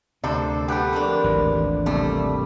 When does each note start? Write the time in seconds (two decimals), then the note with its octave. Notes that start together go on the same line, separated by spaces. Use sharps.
0.24 D2 C3 D4 A4 C5
0.68 A3 B3 G4 B4 G5
0.93 F2 A#3 D4
1.24 G#1 D2 E3
1.86 C3 G3 A3 A#3